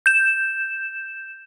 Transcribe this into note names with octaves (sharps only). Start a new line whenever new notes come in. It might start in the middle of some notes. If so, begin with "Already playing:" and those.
G6 E7